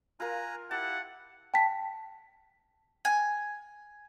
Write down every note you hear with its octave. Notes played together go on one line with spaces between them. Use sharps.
F4 A#4 G#5 A#5 F#6
E4 G4 F#5 A5
G5 A5 B6
G#5